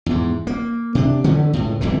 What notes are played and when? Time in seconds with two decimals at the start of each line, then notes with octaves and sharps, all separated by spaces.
0.06 E2 G#2
0.47 A#3
0.95 C3 D4
1.24 D3 E3 A3 C#4
1.53 C#2 A2
1.81 G1 F2 D3 E3